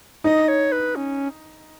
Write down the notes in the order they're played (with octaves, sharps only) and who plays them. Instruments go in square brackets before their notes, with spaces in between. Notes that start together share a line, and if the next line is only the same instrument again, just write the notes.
[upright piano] D#4 [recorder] D#5
[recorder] C#5
B4
C#4